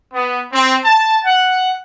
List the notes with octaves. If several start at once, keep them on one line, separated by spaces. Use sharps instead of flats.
B3
C4
A5
F#5